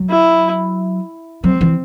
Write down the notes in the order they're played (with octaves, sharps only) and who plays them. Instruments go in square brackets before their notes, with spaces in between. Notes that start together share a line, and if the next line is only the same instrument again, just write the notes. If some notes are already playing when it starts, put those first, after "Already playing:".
Already playing: [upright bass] F#3
[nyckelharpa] E4
[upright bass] F#3 [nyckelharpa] C4
[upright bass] E3